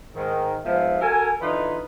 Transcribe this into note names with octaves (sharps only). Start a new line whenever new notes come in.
G#2 D#3
G#2 F3 B3 E5 F5
F#4 A4 A#4 G#5
D3 E3 D#4 F4 B4